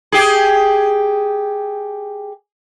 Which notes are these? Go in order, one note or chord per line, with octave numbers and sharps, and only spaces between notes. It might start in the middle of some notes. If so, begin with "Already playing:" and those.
G4 G#4